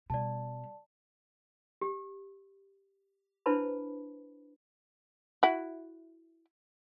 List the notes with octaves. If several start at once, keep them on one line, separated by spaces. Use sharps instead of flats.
B2 G3 D5 A5
G4
D4 E4 B4 C5 A5 B5
E4 F#4